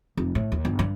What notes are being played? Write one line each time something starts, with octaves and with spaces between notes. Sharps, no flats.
F1
A2
D#2
G1
G2